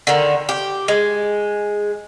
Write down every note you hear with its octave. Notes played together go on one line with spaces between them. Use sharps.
D3 D#3
G4
G#3